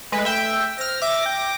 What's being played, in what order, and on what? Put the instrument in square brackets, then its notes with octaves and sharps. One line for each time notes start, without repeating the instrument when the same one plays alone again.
[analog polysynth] G#3 B4 [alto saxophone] A3
[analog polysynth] E5 G5
[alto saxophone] C5 [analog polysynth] F6 A#6
[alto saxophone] E5 [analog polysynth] D6 A#6
[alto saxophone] G5